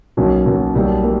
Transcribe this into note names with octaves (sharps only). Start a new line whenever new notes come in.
B1 B2 F#3 A#3 C#4
B1 B2 F#3 A#3 C#4
B1 B2 G3 A#3
G3 A#3